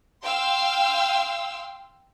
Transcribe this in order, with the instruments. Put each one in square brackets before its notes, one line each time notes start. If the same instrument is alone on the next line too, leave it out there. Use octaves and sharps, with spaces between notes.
[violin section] F5 G5 C6 E6